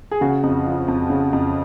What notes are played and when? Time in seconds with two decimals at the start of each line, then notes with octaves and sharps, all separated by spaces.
0.11 G#4
0.21 C#3 F#4
0.43 F2
0.67 F3
0.88 F2
1.10 C#3
1.33 F2